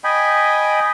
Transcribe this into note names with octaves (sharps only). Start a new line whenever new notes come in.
D#5 G5 G#5 B5